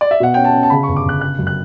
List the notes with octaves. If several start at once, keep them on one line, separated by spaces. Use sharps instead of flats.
D5
E5
B2 F#5
C#4 G5
A5
C#4
A5
C#3 B5
C#6
G1
D6
G1 F#6
C#3 F#6
F#2
F#6